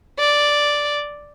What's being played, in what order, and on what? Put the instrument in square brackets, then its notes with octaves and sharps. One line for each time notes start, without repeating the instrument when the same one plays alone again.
[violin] D5